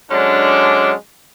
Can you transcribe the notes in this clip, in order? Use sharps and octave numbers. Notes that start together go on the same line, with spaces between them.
D3 F#3 G#3 C#4 D4